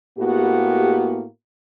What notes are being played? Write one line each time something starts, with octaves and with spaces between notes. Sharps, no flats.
A2 A#3 B3 F#4 G4